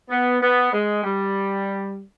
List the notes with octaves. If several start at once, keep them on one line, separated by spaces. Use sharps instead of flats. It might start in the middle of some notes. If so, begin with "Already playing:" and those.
B3
B3
G#3
G3